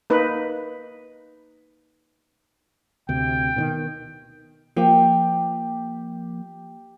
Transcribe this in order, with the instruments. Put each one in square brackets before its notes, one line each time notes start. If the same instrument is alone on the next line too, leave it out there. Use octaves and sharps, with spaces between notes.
[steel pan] A#3 D#4 B4
[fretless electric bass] D2 C3 [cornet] G5
[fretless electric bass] B2 D3 D#3
[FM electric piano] F3 A#3 [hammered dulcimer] G4 G5